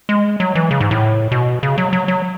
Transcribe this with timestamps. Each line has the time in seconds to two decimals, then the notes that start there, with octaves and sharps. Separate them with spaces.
0.09 G#3
0.40 F#3
0.55 E3
0.71 C#3
0.81 G#2
0.91 A2
1.31 B2
1.63 C#3
1.78 F#3
1.93 F#3
2.08 F#3